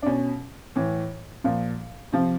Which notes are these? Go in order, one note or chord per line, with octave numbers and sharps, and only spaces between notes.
D4
B2 C#4
A2 E3
A#2 F3
C3 F3